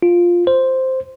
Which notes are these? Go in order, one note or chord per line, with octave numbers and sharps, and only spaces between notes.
F4
C5